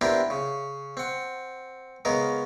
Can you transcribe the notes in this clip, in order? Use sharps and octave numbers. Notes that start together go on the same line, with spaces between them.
B3 C4 D4 E4 G4 A#4
C#3
C4 F#5
C#3 G#3 B3 A#4